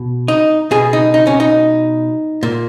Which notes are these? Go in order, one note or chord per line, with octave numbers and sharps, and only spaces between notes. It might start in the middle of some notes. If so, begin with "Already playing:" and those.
Already playing: B2
D#4
B2 G#4
D#4
D#4
C#4
D#4
A#2